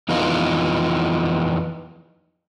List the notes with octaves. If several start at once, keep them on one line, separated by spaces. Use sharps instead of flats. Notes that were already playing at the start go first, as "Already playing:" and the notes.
F2 E3 B3 D#4 F4